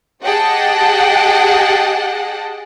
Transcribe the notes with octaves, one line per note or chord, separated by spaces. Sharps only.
G4 G#4 D#5 F#5 G5 A5